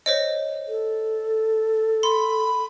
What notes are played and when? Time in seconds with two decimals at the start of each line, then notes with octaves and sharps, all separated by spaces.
0.06 C5 C#5 D#5
0.68 A4
2.03 B5 C6